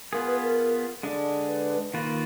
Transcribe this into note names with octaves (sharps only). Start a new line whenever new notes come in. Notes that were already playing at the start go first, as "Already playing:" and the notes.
B3 F4 G#4 A#4
B4
A#4
D3 G#3 D4
B4
D#3 A#3 F4 B4